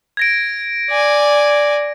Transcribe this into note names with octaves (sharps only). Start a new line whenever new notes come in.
G#6 A#6 D7
D5 G#5